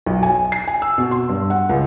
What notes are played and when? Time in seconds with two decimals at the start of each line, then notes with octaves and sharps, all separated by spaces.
0.06 B1
0.23 G#5
0.52 C7
0.68 G#5
0.82 E6
0.98 B2
1.11 C6
1.29 G2
1.50 F#5
1.69 C#2